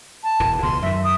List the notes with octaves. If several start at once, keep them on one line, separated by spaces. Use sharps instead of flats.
A5
E1 E3
C#2 B2 E3 C6
F#2 D#3 E5
D#6